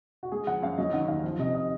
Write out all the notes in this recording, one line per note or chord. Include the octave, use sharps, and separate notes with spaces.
F#4
G#3 G#4
F3 F#5
F#2 F5
F#3 D#5
D#3 F#5
D#2 F5
F3 F5
C3 D#5
D#5